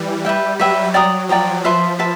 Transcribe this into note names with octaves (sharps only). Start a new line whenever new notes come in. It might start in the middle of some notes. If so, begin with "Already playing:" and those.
Already playing: E3 G3
B4 E5 G5
F#3 B4 E5 G5
D5 G5 A#5 D#6
F3 D5 G5 A#5 D#6
F3 B4 E5 A5 C6
B4 E5 A5 C6